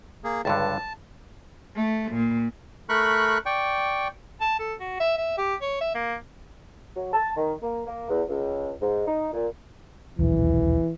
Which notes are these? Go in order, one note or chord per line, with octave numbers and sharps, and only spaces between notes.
A#3 G#4
C#2 G2 D3 A5
A3
A#2
A3 A#4 B5 C#6 F#6
D5 G5 C#6
A5
A4
F#4
E5
E5
G4
C#5
E5
A#3
F#3
A5
D#3
A#3
A#3
E2
C#2
G#2
D#4
A#2
D#1 B1 E2 E3